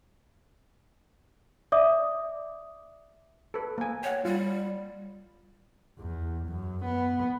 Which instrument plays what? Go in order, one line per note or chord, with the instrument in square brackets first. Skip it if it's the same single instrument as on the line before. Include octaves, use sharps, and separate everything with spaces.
[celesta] D5 E5 D6 D#6
[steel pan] A4 B4
A#3 G#5
[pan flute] C#5 [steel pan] F#5 G5
[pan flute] G3 [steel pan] F4
[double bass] E2
F#2
B3